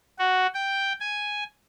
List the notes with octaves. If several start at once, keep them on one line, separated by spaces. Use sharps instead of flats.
F#4
G5
G#5